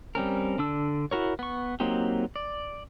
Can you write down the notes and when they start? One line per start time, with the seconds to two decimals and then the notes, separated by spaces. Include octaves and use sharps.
0.15 G3 C4 C#4 A#4
0.58 D3 D4 E6
1.11 E4 F#4 A#4 C#5
1.39 B3 C#6
1.80 F#3 A#3 C4 D#4 G4
2.36 D5